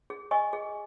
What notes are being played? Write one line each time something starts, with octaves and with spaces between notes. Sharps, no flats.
G#4
D#5 G#5 C#6
G#4